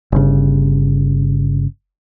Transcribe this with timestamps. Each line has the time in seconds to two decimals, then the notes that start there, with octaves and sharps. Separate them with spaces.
0.12 G1 C#3